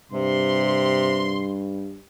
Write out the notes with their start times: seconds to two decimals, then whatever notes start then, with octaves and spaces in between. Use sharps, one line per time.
0.12 G2 C3 C6